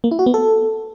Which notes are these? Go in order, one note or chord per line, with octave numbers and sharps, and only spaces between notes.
A#3
E4
F#4
B3
A4